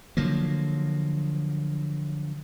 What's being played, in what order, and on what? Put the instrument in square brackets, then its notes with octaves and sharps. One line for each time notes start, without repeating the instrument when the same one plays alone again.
[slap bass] D3 F3 F#3 A#3